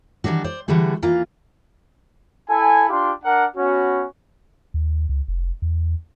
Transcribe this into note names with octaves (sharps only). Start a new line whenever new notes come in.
D#3 E3 G3 D4 F#4
C5 D5
D3 E3 G3 A3 F#4 G#4
E3 A#3 F4
E4 A4 G#5
D4 F4 G4 C6
D4 A#4 F#5
B3 C#4 F#4
D#2
C#2
F1
E2